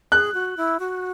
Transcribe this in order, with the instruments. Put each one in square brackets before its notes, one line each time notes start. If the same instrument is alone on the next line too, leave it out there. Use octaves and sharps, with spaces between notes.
[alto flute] G#4 [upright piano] F#6
[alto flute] F#4
E4
F#4